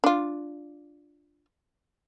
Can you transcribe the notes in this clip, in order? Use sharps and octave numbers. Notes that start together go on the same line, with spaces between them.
D4 F4